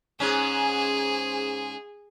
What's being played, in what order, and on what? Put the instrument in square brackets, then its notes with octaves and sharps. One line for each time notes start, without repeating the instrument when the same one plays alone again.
[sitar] G#2 C#4 [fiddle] G#4